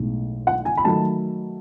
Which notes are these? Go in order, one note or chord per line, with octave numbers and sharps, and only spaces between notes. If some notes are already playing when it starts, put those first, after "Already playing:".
Already playing: B1 A2 G#3
F#5
G#5
B5
D#3 F#3 A3 A5